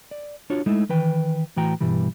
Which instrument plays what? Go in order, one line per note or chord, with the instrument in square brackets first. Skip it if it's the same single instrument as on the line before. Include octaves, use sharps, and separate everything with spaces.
[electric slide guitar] D5
D4 F4 F#4 C#5
G#3 A3 D#4 E4
D#3 E3 B4 G5
A2 E3 F#4 G5 A#5
G2 B2 E3 G3